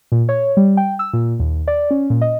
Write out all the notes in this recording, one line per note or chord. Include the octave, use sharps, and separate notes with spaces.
A#2
C#5
G3
G5
E6
A#2
D#2
D5
C#4
A#2
D#5